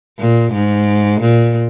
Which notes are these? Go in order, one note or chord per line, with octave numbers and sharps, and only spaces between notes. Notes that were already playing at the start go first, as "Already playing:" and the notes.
A#2
G#2
A#2